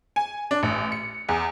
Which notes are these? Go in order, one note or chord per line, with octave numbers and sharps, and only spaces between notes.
G#5
D4
A1
C#7
E2